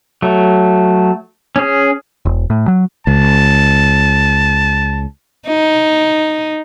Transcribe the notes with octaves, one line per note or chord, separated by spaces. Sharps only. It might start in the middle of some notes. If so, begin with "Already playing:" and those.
F#3 A3
C#4 G#4
E1
A2
F#3
C#2 A5
D#4